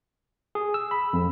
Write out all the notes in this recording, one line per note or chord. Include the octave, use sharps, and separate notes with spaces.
G#4
E6
B5
F2